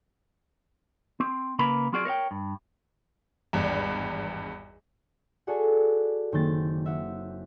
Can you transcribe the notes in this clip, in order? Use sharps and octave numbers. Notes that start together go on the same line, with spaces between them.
C4
C#3 A#3 A#4 B4 B5
F#3 C4 F4 F#4 G#4 D5
A#4 C#5 F5 G5
G2
G#1 E2 G2
F#4 G#4 A4 D5 F#5
F#1 D#3 A#3 C4 G6 A6
E5 F#5